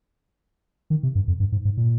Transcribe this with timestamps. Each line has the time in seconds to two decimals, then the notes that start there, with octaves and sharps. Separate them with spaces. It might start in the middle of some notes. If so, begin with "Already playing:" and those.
0.90 D#3
1.03 C3
1.15 G2
1.28 F2
1.40 G2
1.52 G#2
1.65 G#2
1.77 A#2